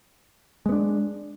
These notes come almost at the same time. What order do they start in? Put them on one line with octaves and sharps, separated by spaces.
G#3 B3 D4